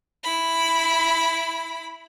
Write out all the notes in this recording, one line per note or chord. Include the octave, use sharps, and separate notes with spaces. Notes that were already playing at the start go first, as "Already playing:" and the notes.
E4 B5